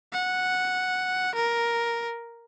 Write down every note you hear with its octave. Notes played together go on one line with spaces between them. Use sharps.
F#5
A#4